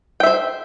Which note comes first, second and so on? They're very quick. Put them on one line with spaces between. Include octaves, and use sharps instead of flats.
G5 E5 C5